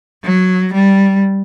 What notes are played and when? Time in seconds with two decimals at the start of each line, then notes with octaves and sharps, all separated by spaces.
0.24 F#3
0.74 G3